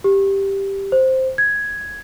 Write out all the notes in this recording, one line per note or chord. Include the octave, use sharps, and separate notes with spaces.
G4
C5
G#6